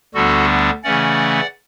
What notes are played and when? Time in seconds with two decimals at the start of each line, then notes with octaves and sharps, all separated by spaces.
0.14 D2 D3 G3 B3 D4 F#4 A4
0.84 C#3 E3 A3 C#4 D5 F#5